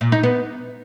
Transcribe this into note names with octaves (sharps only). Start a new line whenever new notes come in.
A#2
D#4
B3